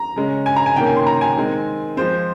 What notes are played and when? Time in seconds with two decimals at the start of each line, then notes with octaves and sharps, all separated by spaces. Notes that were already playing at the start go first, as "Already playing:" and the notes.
Already playing: A#5
0.16 C#3 G#3 C#4
0.46 G#5
0.56 A#5
0.66 G#5
0.76 C3 D#3 A#3 C#4 G5
0.87 G#5
0.96 C6
1.06 A#5
1.21 G#5
1.37 D#3 G#3 C4
1.97 F3 G#3 C4 C5